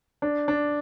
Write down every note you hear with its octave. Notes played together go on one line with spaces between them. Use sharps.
D4
D4